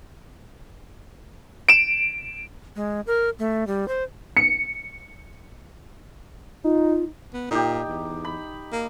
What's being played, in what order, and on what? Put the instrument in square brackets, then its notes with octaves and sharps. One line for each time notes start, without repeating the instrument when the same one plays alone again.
[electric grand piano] D7 E7
[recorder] G#3
A#4
A3
G3
C5
[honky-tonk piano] C#7
[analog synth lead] D#4 [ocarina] F4
[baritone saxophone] B3
[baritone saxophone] A#2 [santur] D#4 G4
[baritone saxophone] E2
[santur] B5
[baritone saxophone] A#3